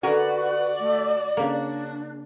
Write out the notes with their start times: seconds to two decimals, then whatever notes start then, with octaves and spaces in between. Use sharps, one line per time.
0.03 D3 F#4 A#4 B4 D5 G#5
0.80 A3
1.37 C#3 A#3 D4